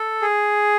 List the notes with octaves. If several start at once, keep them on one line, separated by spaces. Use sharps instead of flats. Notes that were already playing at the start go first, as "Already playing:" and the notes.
Already playing: A4
G#4